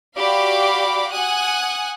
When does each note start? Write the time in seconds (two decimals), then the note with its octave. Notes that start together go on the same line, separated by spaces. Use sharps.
0.18 F#4 G4 D5 F5 B5 D6
1.12 F#5 G#5 D#6 F#6